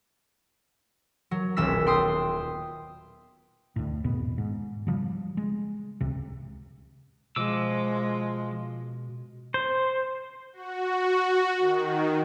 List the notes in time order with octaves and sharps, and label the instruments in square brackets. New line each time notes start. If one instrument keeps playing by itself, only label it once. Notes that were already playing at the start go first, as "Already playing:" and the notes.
[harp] F#3
D#1 B1 E6 B6
G5 C6 D#6
[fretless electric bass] D2 A2
G#1 E2 B2 B3
G#2
C#3 F3 G3
G#3
C#2 C3
[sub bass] B2 [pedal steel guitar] F3 D6 E6 [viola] G#3
[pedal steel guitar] C5
[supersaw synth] F#4
D#3